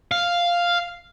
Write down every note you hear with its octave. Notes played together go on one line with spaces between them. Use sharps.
F5